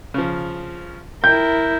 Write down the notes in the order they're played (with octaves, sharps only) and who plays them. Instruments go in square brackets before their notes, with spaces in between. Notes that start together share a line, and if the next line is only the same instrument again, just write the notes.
[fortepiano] C#3 F3
[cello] E4 A#4 [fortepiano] G5 [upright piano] G6